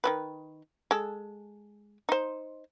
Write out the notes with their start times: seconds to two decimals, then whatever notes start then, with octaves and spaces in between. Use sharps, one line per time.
0.04 D#3 G3 B4
0.91 G#3 A4
2.09 D#4 C5